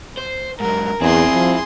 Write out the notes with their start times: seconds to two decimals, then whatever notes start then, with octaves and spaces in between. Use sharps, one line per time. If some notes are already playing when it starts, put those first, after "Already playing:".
0.17 C5
0.60 G#2 F#3 A#4
1.01 E2 C4 E4 G#4 C6
1.33 F3